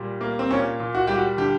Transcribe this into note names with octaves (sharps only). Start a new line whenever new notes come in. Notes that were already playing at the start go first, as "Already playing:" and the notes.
Already playing: A#2 G3
A#3
C4
A#2 C#4
A#2
F#4
G3 G4
F#4
D3 G4